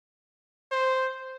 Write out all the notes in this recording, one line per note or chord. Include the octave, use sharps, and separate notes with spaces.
C5